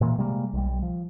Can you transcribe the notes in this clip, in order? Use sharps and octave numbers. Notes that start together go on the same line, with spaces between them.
A#2 E3 A#3
C3 G3 G#3 A#3
B1 G3
F3